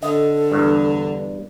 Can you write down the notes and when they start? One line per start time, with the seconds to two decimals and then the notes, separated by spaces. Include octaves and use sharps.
0.02 D3 A4 D#5
0.52 E2 G2